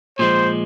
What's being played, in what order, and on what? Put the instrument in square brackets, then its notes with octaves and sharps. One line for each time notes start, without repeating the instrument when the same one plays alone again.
[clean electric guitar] A#2 F3 G#3 [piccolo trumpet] C5